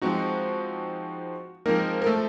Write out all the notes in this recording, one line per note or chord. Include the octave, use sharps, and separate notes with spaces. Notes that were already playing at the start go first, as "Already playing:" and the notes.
F3 G#3 C4 D#4 F#4
F3 G#3 A#3 C4 D#4 A#4
A#4
A3 A4